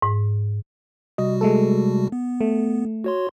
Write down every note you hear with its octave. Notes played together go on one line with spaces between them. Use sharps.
G#2
C3 G3 F#4 D#5
G#3 A3 A4
B3
A3
F#4 C#5 C6